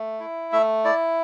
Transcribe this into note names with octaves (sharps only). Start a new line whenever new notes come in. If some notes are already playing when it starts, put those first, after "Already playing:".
Already playing: A3
E4
A3 E5
E4 D5